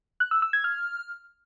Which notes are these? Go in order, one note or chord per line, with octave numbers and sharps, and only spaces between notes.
F#6
E6
E6
G#6
F6